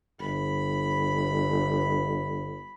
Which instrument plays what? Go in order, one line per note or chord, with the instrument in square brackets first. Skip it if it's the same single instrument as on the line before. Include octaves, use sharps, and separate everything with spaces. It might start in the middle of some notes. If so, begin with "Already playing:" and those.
[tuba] G1 [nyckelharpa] B5